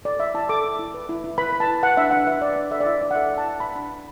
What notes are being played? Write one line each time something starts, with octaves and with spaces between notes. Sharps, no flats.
A4 D5
E4 E5
E4 A5
A4 D6
A4
E4
B4
E4
E4
B4 B5
B4
A5
E4
B4 F#5
D4 E5
D4 F#5
B4 E5
B4 D5
D4
A4 E5
D5
E4 E5
E4 D5
F#5
A4 E5
A4
A5
E4
B4 B5
D4
D4